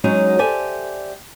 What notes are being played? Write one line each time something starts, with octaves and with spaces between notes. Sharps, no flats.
F#3 G#3 C#4 D#4 F#4 G#4
G4 A4 C5 D5 E5 G#5